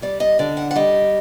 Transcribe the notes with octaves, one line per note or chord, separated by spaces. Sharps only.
G3 D5
D#5
D3 D5
F#5
F#5
G3 D#5